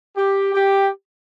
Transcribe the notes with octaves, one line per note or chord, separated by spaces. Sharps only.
G4
G4